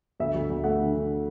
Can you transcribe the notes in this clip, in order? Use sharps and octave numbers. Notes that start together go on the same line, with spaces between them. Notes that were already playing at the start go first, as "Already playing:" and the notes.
D2 E5
D2
D2
A3 F#5
D3
D3